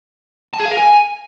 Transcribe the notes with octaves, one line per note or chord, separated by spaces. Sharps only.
A5
G#4
F5
A#4
G#5